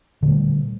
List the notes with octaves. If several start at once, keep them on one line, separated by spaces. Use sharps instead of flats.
A#2 D3 G3 A3